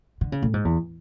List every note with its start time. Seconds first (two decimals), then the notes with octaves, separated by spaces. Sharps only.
0.21 D3
0.32 C#3
0.42 A2
0.54 G#2
0.65 E2